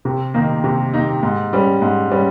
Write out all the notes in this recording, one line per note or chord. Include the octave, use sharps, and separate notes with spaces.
C3
D#3 A#3 D#4
C3
D#3 A#3 D#4
G#2
G3 C#4
G#2
G3 C#4